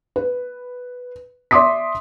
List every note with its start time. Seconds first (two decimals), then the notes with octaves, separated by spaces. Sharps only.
0.16 B4
1.51 D5 E5 C6 D6 D#6 B6